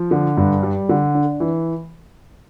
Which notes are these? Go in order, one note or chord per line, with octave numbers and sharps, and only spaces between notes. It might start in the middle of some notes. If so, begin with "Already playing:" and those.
Already playing: F3
D3
G2
G3
D3
D4
E3